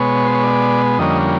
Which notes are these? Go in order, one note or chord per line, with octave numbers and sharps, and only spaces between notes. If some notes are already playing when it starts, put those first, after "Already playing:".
Already playing: B2 G#3 B3 C#5
C5
C#5
D5
F2 D3 G3 A#3 C#4 D#5